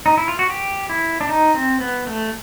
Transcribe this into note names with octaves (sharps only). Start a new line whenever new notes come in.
D#4
E4
F4
F#4
G4
E4
D4
D#4
C4
B3
A3